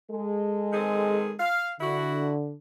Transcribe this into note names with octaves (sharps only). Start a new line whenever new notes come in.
G#3 A4
D#3 C4 G#4
F5
D3 E4 F#4